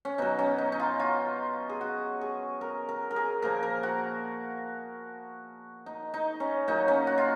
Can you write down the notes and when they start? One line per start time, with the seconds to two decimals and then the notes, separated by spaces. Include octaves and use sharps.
0.05 C#4
0.18 B2 F#3 D#4
0.39 C#4
0.58 D#4
0.72 D#4
0.80 F4
1.00 F4
1.70 G#4
1.81 F#4
2.21 G#4
2.61 A#4
2.89 A#4
3.11 A#4
3.16 G#4
3.42 A#2 F3 A#4
3.63 A#4
3.83 F#4
5.86 D#4
6.14 D#4
6.40 C#4
6.68 A#2 F#3 D#4
6.88 C#4
7.07 F#4
7.18 F4